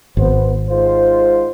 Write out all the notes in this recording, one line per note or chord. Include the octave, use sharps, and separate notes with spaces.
G#1 B3 C5
G#2 F4 C5